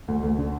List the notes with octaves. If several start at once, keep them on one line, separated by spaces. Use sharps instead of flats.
D2
D2
D3